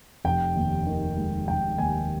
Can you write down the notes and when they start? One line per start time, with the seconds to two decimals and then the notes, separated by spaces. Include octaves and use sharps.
0.24 F1 G5
0.55 D#2
0.87 D#3
1.17 G#3
1.48 F1 G5
1.78 D#2 G#5